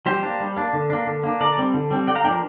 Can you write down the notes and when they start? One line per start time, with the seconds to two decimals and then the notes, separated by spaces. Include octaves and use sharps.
0.06 G3 G4 C5
0.23 A#3 D4
0.40 G3
0.56 A#3 D4
0.73 D3
0.90 A#3 D4
1.07 D3
1.23 A#3 D4
1.40 D3 A#4 D5
1.57 G3 C4
1.74 D3
1.90 G3 C4
2.07 D3 D5 G5
2.15 F5 A#5
2.24 A#3 D4 D5 G5
2.28 F3 A#4